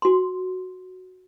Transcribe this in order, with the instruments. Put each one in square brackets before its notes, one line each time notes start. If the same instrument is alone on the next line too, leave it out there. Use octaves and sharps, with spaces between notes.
[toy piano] F#4 C6